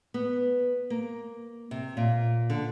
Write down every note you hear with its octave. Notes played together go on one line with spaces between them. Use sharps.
B3
A#3
C3
A#2
D3